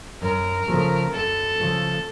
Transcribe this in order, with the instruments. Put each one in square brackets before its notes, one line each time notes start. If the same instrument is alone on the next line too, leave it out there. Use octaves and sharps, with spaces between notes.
[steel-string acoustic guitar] F#2 [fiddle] A#4
[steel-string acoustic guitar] C#3 F3 A3
[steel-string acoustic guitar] F#2 [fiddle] A4
[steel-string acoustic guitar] C#3 F3 A3